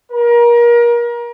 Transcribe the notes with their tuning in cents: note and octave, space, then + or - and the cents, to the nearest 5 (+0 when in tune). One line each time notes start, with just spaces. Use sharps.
A#4 +30